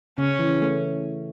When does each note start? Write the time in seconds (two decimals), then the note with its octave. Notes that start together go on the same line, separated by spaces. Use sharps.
0.18 C#3 C#4
0.39 E3
0.62 A3